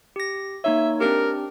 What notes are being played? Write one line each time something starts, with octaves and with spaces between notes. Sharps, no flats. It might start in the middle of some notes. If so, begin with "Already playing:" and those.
G4 A#6
A#3 D#4 C#5 E5
C4 D4 G4 A#4